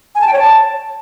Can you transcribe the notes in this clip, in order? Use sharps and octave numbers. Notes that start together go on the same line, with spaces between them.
G#5
A5
G5
C#5
A5